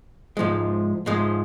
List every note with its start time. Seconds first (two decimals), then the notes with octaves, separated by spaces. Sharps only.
0.37 G#2 F3 G#3
1.06 G#2 F3 G#3